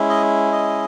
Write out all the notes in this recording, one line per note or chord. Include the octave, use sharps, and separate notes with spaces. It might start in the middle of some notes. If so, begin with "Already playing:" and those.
Already playing: G#3 C#4 E4
D#5
D#5